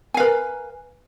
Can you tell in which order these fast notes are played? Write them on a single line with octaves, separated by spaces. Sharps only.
G#5 F5 B4 A#4